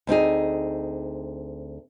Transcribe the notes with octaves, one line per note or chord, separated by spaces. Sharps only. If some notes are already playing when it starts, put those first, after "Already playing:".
D2 C4 D#4 G#4